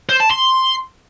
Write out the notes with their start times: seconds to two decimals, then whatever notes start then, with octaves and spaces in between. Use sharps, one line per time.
0.09 C5
0.20 A5
0.31 C6